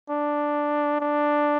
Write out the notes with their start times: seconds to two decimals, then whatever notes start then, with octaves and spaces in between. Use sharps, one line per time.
0.10 D4
1.00 D4